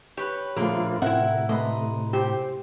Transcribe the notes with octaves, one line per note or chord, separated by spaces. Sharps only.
G4 B4 C#5
A#2 D3 F3 A3 A#3 F4 G#4
A2 C3 C4 E4 A#4 E5 F#5
A3 B4 D#5 A#5 C6
G4 C5